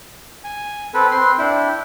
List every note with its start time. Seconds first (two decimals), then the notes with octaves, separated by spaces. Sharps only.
0.44 G#5
0.94 C4 A4 B4
1.11 C4 B4 C6
1.38 D4 E4 G5